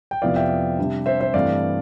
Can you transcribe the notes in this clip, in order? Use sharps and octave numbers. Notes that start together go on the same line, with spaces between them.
G5
F2 C3 F3 B3 E4 D5 F5
E5 G5
C3 G3 D4
C5 E5
C5 E5
G2 E3 A3 C4 D5 F5